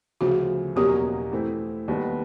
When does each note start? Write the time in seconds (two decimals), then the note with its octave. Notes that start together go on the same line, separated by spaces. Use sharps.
0.21 D2 C#3 F3 F#4
0.76 E2 B2 F#3 A#3 C#4 G4
1.32 E3 A3 C4 E4
1.88 D#2 D#3 G3 B3